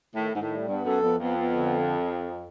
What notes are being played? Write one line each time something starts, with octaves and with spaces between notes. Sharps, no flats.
A2 D#3
G#2 D#3
A2
G3
G2 B3
F#2 A4
F2 B3
F2 B3
B3
D3